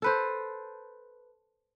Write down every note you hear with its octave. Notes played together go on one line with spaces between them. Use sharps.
A4 B4 C5